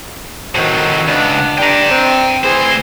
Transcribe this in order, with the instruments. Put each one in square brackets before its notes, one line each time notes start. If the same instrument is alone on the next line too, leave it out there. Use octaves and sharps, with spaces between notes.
[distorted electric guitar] A2 D#3 [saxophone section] F#3 C4
[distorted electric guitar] C#2 [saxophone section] B3 D4
[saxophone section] G2 D4 [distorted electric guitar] G5 A#5
[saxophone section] C4
[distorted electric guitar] D2 C5 [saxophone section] E3 C4 G#4